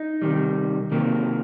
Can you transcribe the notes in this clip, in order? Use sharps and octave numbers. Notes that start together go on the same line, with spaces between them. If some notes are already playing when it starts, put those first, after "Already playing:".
Already playing: D#4
C3 D#3 G3
C3 D#3 F#3 A#3